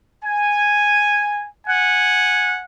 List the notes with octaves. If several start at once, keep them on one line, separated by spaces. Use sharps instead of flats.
G#5
F#5 G#5